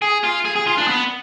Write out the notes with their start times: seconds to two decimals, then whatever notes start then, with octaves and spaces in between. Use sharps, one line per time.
0.02 G#4
0.23 F4
0.45 G#4
0.56 G#4
0.67 F4
0.78 D4
0.88 B3